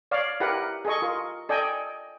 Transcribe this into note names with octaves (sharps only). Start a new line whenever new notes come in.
C#5 D5 F5
E4 G4 A#4 B4 F#5
G#4 A4 D#5 C#6
F4 A#4
A4 D5 D#5 G5 G#5